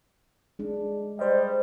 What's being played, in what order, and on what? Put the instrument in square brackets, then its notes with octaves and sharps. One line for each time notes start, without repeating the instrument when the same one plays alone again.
[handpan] G#3 D4
[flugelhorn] G3 [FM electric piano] C5 D#5